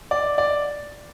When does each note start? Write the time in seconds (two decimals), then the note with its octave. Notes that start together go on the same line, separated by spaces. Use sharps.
0.11 D5
0.38 D5